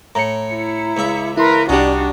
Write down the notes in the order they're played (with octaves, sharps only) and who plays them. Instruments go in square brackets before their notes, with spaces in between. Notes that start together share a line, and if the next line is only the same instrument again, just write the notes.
[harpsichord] A2 [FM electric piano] A#5 C#7
[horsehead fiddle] E4
[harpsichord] C#2 E5
[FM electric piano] E4 C6 [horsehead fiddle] A#4 B4
[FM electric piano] C2 G4 [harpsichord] G3 D#4 [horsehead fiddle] D4 F#4